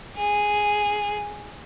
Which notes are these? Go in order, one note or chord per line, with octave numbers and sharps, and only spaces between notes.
G#4